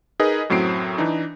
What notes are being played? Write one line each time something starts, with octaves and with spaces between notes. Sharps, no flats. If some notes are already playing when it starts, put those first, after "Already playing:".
D#4 G#4 A#4 B4 D#5
F#2 A2 F#3 C4 C7 D7
E3 D4 D#4